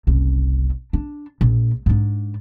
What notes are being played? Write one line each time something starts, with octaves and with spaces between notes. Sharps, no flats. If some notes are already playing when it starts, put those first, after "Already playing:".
F#1 C2
D4
A#1
G#2 D4